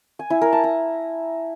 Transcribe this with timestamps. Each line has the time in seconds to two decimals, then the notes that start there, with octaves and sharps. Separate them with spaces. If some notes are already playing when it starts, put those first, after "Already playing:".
0.19 G#5
0.30 E4
0.41 A#4
0.53 A5
0.64 A#5